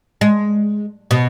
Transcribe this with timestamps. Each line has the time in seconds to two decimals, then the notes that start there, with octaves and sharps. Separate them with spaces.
0.21 G#3
1.11 B2